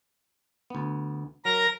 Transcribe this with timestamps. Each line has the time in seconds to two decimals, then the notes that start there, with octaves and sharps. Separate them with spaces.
0.70 D2 B3
1.45 F#3 A#4 A#5 A#6